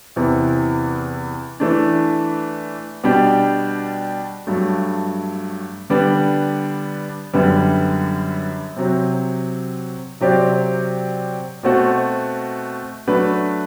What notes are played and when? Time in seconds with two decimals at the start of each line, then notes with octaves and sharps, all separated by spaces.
0.16 E2 C3 E3
1.60 E3 A3 D4
3.03 B2 G3 D4 G4
4.47 G2 F#3 A3
5.90 D3 G3 B3 D4
7.33 F#2 D3 G3 B3
8.76 C3 F#3 C4
10.20 C3 F#3 C4 G4 D5
11.63 B2 A3 C4 F#4
13.07 F#3 A3 D4 F#4 B4